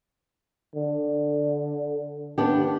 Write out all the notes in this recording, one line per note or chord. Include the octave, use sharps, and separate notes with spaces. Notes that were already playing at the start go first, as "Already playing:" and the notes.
D3
D#2 B3 D4 G4